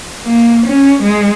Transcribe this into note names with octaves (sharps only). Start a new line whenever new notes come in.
A#3
C#4
G#3